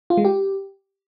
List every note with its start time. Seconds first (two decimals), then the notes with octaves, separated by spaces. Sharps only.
0.10 F4
0.17 G#3
0.25 G4